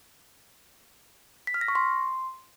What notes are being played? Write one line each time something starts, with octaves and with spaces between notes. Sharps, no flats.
B6
F6
A#6
C#6
C6